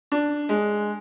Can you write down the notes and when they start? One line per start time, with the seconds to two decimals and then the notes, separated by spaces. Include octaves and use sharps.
0.12 D4
0.49 G#3